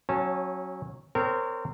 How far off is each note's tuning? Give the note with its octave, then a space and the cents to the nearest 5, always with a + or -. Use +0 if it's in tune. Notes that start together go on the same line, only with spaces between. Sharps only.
F#3 +5 C#4 -25 A5 +0
C4 -20 A#4 -30 C#5 +0